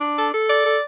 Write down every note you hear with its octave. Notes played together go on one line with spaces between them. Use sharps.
D4
A4
A4
D5
A4